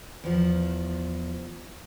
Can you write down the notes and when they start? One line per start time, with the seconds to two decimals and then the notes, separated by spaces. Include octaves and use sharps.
0.24 E2 F3